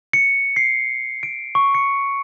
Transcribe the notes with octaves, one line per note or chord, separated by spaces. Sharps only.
C#7
C7
D7
C#6
C#7